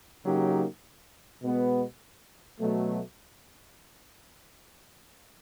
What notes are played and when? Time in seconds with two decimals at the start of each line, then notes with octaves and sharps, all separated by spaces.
0.25 C#3 F#3 A#3 D#4 G4
1.42 B2 G#3 B3
2.59 B2 F#3 A3